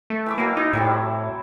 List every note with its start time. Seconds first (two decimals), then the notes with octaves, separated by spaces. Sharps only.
0.10 A3
0.26 E3 E5 D6
0.38 B2 F#3 A#3
0.57 D#4 E4
0.73 A2 F#3 G3 C4